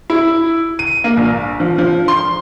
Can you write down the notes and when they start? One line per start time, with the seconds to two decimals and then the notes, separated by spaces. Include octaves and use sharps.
0.10 E4
0.79 D#7
1.04 A#3
1.17 A#1
1.60 F3
1.78 F3
2.08 C6